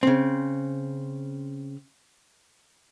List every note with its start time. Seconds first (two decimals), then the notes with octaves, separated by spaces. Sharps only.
0.03 C#3 C4